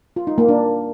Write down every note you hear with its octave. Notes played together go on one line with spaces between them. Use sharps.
F4
D#4
A#3
D4